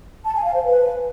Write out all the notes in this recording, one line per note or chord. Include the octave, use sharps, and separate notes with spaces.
A5
G#5
F5
C5
B4